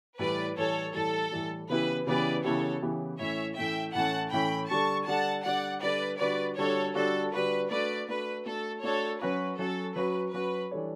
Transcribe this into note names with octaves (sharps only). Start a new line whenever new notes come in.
A2 E3 G3 B4 D5
A2 E3 G3 A4 C#5
A2 E3 G3 A4
A2 E3 G3
C#3 E3 B3 E4 G4 B4
C#3 E3 B3 E4 G4 B4 D5
C#3 E3 B3 E4 G4 A4 C#5
C#3 E3 B3 E4 G4
A2 E3 A3 C#4 C#5 E5
A2 E3 A3 C#4 E5 G5
A2 E3 A3 C#4 F#5 A5
A2 E3 A3 C#4 G5 B5
D3 G3 D4 A4 A5 C#6
D3 G3 D4 A4 F#5 A5
D3 G3 D4 A4 D5 F#5
D3 G3 D4 A4 B4 D5
D3 G3 D4 F#4 B4 D5
D3 G3 D4 F#4 A4 C#5
D3 G3 D4 F#4 A4
D3 G3 D4 F#4 B4
A3 D4 F#4 B4 D5
A3 D4 F#4 B4
A3 D4 F#4 A4
A3 D4 F#4 A4 C#5
F#3 C#4 F#4 B4
F#3 C#4 F#4 A4
F#3 C#4 F#4 B4
F#3 C#4 F#4 B4
E3 G3 D4 A4 C#5